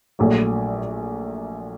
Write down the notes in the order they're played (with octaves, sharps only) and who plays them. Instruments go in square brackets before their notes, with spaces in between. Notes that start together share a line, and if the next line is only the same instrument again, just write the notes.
[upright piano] A#1 A#2 F#3 A3